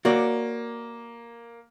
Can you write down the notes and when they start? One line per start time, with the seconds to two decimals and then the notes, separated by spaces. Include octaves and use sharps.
0.05 A#3 F#4 C#5 D5